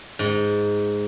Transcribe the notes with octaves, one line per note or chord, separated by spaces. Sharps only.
G#2